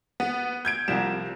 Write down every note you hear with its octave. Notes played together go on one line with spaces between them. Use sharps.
B3
G6 G#6 D7
C2 F3 G3 E7